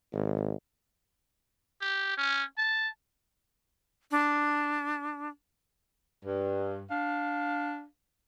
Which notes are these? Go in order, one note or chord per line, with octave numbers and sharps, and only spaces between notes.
G#1
G4
C#4
A5
D4
G2
D4 F5